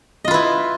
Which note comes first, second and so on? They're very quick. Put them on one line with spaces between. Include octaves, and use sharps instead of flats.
D#5 F4 B4 E4